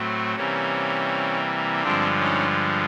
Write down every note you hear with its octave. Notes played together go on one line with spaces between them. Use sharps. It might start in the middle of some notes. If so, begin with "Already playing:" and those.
Already playing: A2 F#3 A3 C4
C3 E3 G3 A#3 C#4
G2 D3 F3 G#3 C4 D4
C#4 D#4